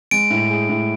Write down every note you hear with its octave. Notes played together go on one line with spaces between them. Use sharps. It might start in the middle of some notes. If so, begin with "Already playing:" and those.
G#3 D7
A2
G#4
A2